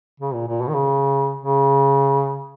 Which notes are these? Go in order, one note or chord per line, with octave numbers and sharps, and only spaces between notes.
C#3
A#2
A#2
B2
D#3
C#3
C#3